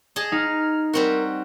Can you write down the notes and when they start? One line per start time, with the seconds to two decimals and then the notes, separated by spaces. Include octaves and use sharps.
0.16 G#4 D#5 A5
0.32 D#4 F6
0.93 G3 C4 F#4 A#4